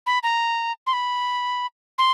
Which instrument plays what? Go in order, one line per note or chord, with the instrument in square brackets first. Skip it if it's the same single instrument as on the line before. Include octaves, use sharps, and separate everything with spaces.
[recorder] B5
A#5
C6
B5
C6